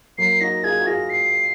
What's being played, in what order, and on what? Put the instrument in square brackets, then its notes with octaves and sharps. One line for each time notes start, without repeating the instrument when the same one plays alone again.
[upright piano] F#3 A#3 [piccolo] C7
[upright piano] D#4 F#4 [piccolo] A#6
[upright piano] F4 G#4 [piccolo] G#6
[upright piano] F#4
[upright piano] F4 G#4 [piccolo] A#6
[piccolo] C7